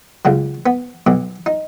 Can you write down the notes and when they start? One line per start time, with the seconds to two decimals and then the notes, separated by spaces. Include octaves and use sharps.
0.25 C#2 C#3 F#3
0.66 B3
1.07 B1 B2 F#3
1.46 D#4